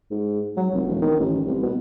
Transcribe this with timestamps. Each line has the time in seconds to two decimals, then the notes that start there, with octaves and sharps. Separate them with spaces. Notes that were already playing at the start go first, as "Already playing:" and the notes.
0.10 G#2
0.57 F#3
0.74 F1
0.86 E1
1.01 D#3
1.19 A1
1.46 C2
1.62 B2